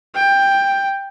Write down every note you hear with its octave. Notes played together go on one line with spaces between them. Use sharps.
G5